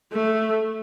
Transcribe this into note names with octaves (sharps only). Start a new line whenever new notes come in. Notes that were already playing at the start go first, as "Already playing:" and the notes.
A3